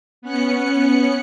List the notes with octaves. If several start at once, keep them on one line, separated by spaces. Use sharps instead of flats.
B3 C#4 F#6 C#7